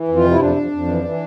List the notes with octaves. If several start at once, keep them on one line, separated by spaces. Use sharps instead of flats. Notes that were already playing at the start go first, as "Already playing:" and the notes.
Already playing: E3
F2
F4
C3
E4
F2 D4
F2
F2
E3
E3